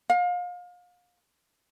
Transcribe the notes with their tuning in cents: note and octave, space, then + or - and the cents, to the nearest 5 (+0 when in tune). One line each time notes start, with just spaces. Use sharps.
F5 +35